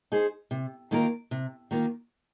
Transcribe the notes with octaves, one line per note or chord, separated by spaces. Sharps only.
D#4 G#4 C5
C3
D#3 A#3 F4 A#4
C3
D#3 A#3 F4